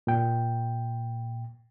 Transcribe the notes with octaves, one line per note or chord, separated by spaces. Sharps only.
A#2 G5